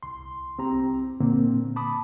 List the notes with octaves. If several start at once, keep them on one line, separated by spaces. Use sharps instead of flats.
C2 C6
C2 C4 G4 A#5
A#2 D3 A#3 C4
A5 B5 D6 D#6